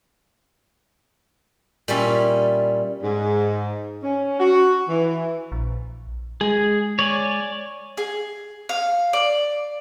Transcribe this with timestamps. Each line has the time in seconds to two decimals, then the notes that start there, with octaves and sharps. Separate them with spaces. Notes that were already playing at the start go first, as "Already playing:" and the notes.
1.88 A#2 G3 C#4 E4
3.02 G#2
4.03 C#4
4.40 F#4
4.88 E3
5.52 A#1
6.41 G#3 G#4
6.99 C#5 D5 G#5
7.98 G#4
8.69 F5
9.13 D5